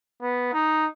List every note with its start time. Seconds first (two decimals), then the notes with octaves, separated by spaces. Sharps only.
0.22 B3
0.54 D#4